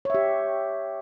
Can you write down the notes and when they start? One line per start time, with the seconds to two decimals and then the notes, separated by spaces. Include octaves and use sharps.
0.05 C#5
0.10 E5
0.14 G4